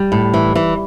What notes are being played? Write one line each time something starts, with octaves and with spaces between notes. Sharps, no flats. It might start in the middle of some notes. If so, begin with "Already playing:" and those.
Already playing: G3
A2
E3
E3